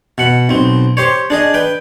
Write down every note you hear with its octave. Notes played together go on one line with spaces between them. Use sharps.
B2 F#5 B5
B1 C4
G4 C5 C#5
D4 G#4 D#5
B4 G5